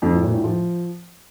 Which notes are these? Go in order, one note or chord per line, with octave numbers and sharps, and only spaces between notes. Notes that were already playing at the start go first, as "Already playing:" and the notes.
F2
A2
A#2
A2
F3